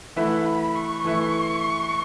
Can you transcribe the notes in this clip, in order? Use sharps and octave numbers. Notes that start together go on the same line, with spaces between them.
E3 A3 E4 B4 E5 F#5
B5
C#6
E3 A3 E4 B4 E5